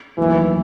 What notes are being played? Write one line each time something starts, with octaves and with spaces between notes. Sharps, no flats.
D#2 D#3 E3 F#3 A3